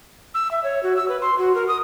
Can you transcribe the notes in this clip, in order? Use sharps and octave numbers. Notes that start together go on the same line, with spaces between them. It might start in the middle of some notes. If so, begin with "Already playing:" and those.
E6
E5
C#5
F#4
E6
B4
C6
F#4
A#4
D#6